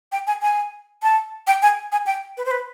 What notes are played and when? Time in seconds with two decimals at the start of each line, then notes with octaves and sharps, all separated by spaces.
0.12 G5
0.27 G#5
0.42 G#5
1.03 A5
1.47 G5
1.62 G#5
1.92 G#5
2.06 G5
2.37 B4
2.45 C5
2.51 B4